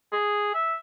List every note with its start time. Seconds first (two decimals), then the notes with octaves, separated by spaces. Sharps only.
0.13 G#4
0.54 E5